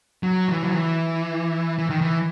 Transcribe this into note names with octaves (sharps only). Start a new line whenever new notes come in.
F#3
E3
F#3
E3
E3
D#3
E3